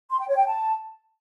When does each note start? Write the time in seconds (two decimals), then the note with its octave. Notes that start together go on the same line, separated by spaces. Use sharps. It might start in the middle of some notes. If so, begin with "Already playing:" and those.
0.11 C6
0.20 G5
0.28 C#5
0.37 G5
0.46 A5